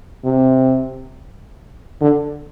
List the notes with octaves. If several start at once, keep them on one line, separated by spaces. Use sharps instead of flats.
C3
D3